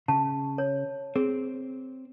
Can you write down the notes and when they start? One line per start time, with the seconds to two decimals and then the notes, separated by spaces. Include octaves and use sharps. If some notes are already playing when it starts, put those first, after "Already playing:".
0.08 C#3 A5
0.58 C#5
1.16 C4 G#4